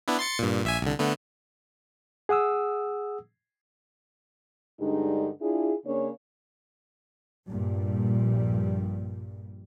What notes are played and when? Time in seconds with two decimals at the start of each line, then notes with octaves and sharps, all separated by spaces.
0.08 B3 D4 E4
0.19 C6 A6 C#7
0.39 G2 A#2
0.64 A#1 E5 G#5
0.82 C2 D3
0.99 D3 A3 B3
2.29 G#4 F#5 D#6 E6
4.80 G2 D3 G#3 D#4
5.41 D4 E4 F4 G#4
5.85 C#3 A#3 C#4 D4 C#5
7.49 A#1 G2 A#2 G3